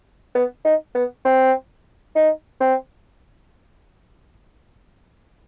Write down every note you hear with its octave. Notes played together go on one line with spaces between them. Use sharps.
B3
D#4
B3
C4
D#4
C4